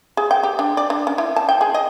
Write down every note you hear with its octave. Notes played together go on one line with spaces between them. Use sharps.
G#4
G5
G4
D4
D5
D4
C#4
E4
A5
G5
G#4
D#5